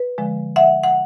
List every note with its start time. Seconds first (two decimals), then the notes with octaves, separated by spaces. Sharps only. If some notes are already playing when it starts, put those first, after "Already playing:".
Already playing: B4
0.18 D3 F3 G#3
0.56 E5 F#5
0.84 F#5